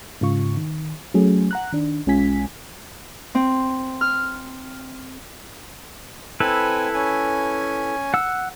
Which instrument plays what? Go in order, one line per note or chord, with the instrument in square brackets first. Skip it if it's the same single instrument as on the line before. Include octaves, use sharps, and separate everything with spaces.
[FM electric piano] G#2 C#3 F4 C#6
D#3
F#3 A3 C#4 G#4
F#5 A#5 F#6
D#3 D4
B1 G#3 C#4 F4 G#5 B6
[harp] C4
F6
[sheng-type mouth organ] C4 G#5 [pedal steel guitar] E4 A4 B4
[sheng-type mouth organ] C#4 G#5
[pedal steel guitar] F#5 E6